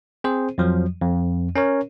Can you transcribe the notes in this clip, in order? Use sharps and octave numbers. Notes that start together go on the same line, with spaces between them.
C4 G#4 C5
F2 F3 F#3
F2
C#4 A#4 C#5